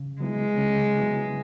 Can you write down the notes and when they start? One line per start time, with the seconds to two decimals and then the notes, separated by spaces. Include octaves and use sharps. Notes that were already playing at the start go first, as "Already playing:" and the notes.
Already playing: C#3
0.20 F#3 G#3 B3 E4
0.58 C#3
0.97 F#3 B3 E4